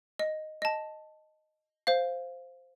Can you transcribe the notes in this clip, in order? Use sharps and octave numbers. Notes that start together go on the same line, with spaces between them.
D#5
D#5 A5
C5 F5